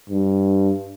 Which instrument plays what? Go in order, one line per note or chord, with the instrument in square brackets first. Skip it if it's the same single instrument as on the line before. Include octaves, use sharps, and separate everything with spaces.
[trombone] G2